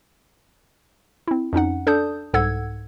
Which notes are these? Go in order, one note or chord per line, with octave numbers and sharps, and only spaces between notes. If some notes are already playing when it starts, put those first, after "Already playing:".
C4 E4
F2 C#4 D#4 F#5
D4 A4 D5 A5 D#6 G6
C2 G#2 A4 F#5 E6 G#6